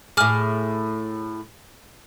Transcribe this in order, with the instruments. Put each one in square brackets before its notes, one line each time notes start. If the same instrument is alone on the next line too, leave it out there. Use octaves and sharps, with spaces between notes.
[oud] A2 G#4 [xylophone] D6 F6